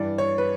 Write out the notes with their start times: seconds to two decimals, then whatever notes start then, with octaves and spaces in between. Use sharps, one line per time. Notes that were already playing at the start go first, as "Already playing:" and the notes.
Already playing: G2 E3 D5
0.18 C#5
0.38 B4